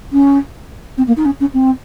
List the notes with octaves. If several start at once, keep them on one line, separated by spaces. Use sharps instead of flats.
C#4
C4
A#3
D#4
C#4
C#4
C4